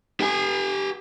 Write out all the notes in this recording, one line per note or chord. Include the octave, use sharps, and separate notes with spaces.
G4 G#5